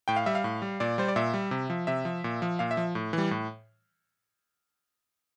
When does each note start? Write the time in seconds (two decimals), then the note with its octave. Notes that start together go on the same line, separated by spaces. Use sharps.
0.08 A2 G5
0.16 F5
0.26 G3 E5
0.35 F5
0.44 A2
0.62 G3
0.80 A#2 D5
0.98 G3 C5
1.08 D5
1.16 A#2 E5
1.34 G3
1.51 C3
1.70 F3
1.87 C3 E5
2.05 F3
2.24 A#2
2.42 F3
2.59 A#2 F5
2.71 E5
2.77 F3
2.95 A2
3.13 E3 G3
3.31 A2